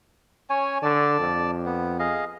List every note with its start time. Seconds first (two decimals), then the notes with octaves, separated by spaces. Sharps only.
0.50 C#4 C#5 G#5
0.83 D3 D5 A5
1.20 F2
1.66 B3
1.99 G#4 D#5 F5